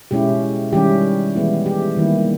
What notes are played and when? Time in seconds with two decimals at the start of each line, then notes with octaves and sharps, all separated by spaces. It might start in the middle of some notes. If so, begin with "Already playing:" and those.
0.11 B2 G#3 C#4 E4 G4
0.72 D#3 G3 C#4 E4 G4
1.35 E3 G#3 B3 E4
1.66 G4
1.97 D#3 G3 A#3 E4